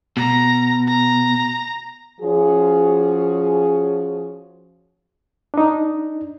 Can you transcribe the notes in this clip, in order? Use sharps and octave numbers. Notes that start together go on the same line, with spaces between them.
B2 A#5
A#5
F3 C#4 F#4 G#4
D4 D#4